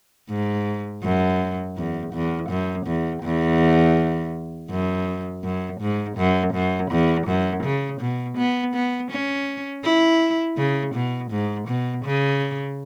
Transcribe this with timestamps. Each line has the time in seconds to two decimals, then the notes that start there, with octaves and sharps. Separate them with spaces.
0.29 G#2
1.04 F#2
1.77 E2
2.13 E2
2.50 F#2
2.86 E2
3.23 E2
4.70 F#2
5.44 F#2
5.81 G#2
6.18 F#2
6.54 F#2
6.91 E2
7.27 F#2
7.63 C#3
8.01 B2
8.38 B3
8.75 B3
9.11 C#4
9.84 E4
10.57 C#3
10.95 B2
11.31 G#2
11.68 B2
12.05 C#3